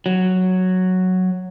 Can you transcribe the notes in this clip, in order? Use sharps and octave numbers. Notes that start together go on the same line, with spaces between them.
F#3